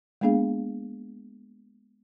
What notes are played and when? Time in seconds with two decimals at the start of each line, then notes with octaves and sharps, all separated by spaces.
0.21 G#3 A#3 B3 D4 G#4 F5